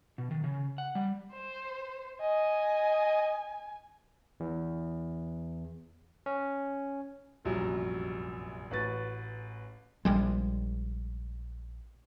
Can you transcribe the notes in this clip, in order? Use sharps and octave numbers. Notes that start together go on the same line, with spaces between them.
B2
D#3
C#3
F#5
G3
C5
D#5 G#5
E2
C#4
F1 A#1 F#2 F#3 G3
A1 F#4 B4 A6
A#1 G3 G#3